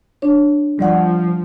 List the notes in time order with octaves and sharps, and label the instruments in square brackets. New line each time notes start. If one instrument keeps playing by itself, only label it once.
[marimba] D4 C#5
[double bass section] F3 [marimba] G3 D5 F#5